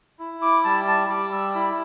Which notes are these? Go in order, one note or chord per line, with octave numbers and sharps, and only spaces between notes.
E4
D6
G3 A5
A5
G3 D6
E6
E4 B5